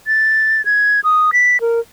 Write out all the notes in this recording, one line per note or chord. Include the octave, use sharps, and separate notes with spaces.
A6
G#6
D#6
B6
A#4